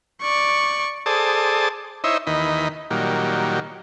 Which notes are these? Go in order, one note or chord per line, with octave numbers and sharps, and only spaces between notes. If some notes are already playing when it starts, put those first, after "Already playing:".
D5 C#6
G#4 A4 C5 D5 A5 D#6
D#4 E4 C5 C#5 D#5 E5
D#2 D#3 E3 D#5 B5
A#2 D#3 F#3 G3